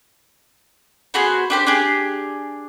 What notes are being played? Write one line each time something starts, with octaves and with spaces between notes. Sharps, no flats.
B3 F#4 G#4 C5
D4 G4 C5
D4 G4 G#4